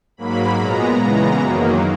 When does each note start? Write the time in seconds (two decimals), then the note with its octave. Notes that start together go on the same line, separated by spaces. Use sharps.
0.17 G#2 F#3 A#3 B5
0.58 A#2 G#3 B3 A#5
0.99 C#3 E3 G#3 B3 A#5
1.39 F#2 D#3 F#3 A#3